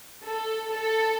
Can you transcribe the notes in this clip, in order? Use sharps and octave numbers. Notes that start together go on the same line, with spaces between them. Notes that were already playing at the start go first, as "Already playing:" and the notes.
A4
A4